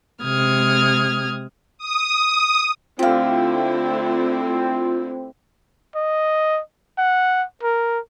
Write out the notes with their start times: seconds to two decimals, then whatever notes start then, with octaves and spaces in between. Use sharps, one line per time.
0.23 C3 G#3 D#6 F6 G#6
1.78 D#6
2.99 D3 A3 C4 E4 F4 G4 F5
5.95 D#5
6.98 F#5
7.63 A#4